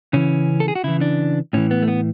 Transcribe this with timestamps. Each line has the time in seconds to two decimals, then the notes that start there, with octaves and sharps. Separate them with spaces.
0.13 C#3 E3 C#4
0.60 A4
0.68 G#4
0.75 F#4
0.84 C#3 E3 E4
1.01 D4
1.53 A2 E3 C#4
1.71 B3
1.82 A3
1.88 B3